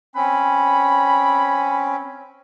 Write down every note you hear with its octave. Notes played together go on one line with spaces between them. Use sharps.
C4 C#4 B5